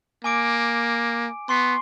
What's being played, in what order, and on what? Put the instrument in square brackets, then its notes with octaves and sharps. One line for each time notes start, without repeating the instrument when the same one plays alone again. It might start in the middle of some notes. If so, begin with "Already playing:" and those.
[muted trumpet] A#3 [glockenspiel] G#5 D6 D7
[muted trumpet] B3 [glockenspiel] C6 C#6 C7